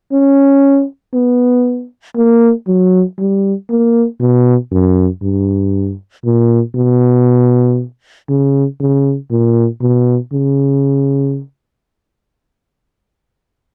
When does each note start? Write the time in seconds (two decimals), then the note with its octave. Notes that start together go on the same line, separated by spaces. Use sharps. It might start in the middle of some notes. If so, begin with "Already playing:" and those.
0.12 C#4
1.14 B3
2.16 A#3
2.68 F#3
3.18 G3
3.70 A#3
4.20 B2
4.72 F#2
5.23 G2
6.25 A#2
6.75 B2
8.29 C#3
8.80 C#3
9.31 A#2
9.81 B2
10.33 C#3